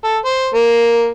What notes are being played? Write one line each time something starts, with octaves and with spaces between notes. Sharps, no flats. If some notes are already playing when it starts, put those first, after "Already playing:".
A4
C5
A#3